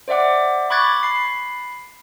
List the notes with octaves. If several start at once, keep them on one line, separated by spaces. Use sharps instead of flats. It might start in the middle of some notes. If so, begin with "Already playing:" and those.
C5 D5 E5 F#5 D6
B5 C#6 D6 F#6 G#6 A6
B5 C7